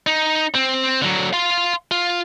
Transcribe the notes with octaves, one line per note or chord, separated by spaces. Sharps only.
D#4
C4
D3 F#3
F5 C6
F4